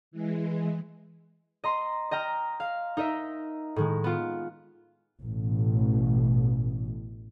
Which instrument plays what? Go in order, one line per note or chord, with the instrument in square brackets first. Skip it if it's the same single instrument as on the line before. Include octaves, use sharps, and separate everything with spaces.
[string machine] E3 G#3
[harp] D#5 A#5 C6
D#5 G5 A#5 F6
F5
D#4 A#4 D#5 E5
A2 D#3 G#3
B3 F4
[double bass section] A1 B2